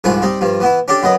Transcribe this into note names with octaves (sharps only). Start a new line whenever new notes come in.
C2 G#2 F3 B4 G#5 C#6
G3 C4 D#4
G2 F3
E3 B3 E4
C#4 D4 G4 A4
F#2 F#3 B3 D#5